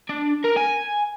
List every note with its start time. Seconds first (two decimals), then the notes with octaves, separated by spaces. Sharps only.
0.09 D4
0.45 A#4
0.57 G#5